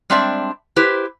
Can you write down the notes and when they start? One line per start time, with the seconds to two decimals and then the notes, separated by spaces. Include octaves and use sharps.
0.10 G3 G#3 C4 D4 D5 E5
0.76 E4 G4 B4 C5